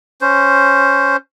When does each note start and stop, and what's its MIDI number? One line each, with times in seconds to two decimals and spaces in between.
0.21 1.17 61
0.21 1.17 72